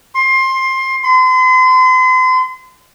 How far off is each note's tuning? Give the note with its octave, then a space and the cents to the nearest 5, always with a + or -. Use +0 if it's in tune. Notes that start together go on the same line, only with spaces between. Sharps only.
C6 +20
C6 -40